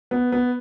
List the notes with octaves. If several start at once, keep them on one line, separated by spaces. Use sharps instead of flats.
B3
B3